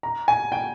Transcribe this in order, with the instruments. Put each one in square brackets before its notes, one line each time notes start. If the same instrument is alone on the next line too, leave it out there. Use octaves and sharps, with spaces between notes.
[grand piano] A#5
G#5
G5